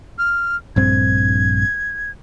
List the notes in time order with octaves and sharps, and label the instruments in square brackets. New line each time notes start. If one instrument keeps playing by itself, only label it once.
[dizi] F6
[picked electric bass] A#1 G2 C4 [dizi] G#6